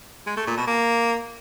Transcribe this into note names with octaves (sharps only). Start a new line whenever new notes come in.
G#3
A3
A#2
B2
A#3